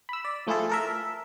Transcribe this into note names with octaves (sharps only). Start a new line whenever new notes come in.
B5 E6
D5
F3 A3 E4 F4 G#4 A4
A4 A#4 E5